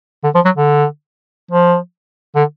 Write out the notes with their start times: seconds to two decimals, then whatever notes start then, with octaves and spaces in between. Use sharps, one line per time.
0.24 D3
0.35 F3
0.45 F#3
0.56 D3
1.51 F3
2.36 D3